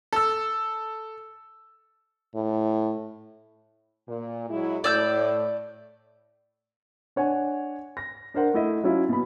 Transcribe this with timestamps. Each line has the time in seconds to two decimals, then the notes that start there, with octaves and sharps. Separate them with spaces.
0.13 A4 E6
2.35 A2
4.08 A#2
4.50 F#3 G#3 E4
4.84 A2 D5 E6 G6
7.16 D4 C#5 F#5 G#5
7.97 A#6
8.34 D4 A#4 C5 F#5
8.54 A3 E4 D#5
8.84 F#3 C#4 E4 F4
9.09 B2 B5